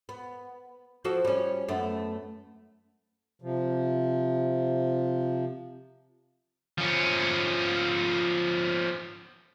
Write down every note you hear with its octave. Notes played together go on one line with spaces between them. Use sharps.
B3
F3 F#4 A4
G3 C#4
F#2 A3 B3
C3 F3
F3 C#4